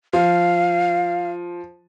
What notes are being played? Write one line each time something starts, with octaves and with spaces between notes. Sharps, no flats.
F3 F5